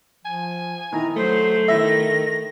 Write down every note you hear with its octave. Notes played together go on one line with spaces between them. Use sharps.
F3 G#5
D#3 E4 A#5
F#3 A3 C5
D#3 E4 E5 A#6